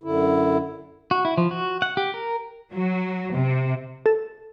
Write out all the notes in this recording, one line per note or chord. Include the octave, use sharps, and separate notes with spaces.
F#2 D3 E4
F#4
E4
F3
F#4
F#5
G4
A#4
F#3
C3
A4